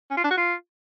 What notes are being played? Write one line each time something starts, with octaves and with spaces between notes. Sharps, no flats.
C#4
F4
D4
F#4
F4